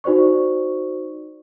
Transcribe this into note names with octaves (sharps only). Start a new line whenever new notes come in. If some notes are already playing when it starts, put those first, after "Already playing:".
D#4 F#4 C5 D5 C#6